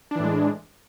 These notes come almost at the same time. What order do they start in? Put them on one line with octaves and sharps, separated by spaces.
D4 E3 A2 G#3